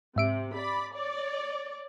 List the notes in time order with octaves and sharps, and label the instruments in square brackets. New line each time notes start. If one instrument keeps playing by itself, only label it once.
[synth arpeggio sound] G#2 E5 D7 [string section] C3
[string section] D5 B5
C#5 D5